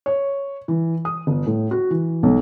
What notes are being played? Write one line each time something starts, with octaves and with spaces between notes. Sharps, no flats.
C#5
E3
D#6
G1
A2
F#4
E3
B1